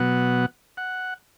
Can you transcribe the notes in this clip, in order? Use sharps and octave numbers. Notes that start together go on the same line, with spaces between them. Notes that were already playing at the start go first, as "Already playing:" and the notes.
Already playing: B2 F#3 B3 F#5
F#5